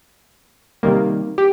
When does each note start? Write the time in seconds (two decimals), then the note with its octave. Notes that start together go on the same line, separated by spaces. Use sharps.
0.83 C3 D#3 G3 A#3
1.38 G4